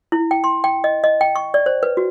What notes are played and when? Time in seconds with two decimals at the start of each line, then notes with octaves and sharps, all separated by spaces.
0.12 E4
0.31 G5
0.44 C6
0.64 G5
0.84 D#5
1.04 D#5
1.21 G5
1.36 C#6
1.54 D5
1.66 C5
1.83 B4
1.97 F#4